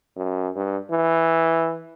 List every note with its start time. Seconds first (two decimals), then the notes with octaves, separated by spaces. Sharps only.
0.16 F#2
0.56 G2
0.91 E3